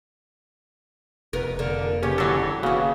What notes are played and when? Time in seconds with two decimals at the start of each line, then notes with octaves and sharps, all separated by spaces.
1.33 F1 B3 A#4
1.59 D3 A#3
2.03 D#2 C#3 B3 C#4 G4
2.18 D3 E3 F#3 D4 A4
2.63 D#2 C#3 E3 B3 F#4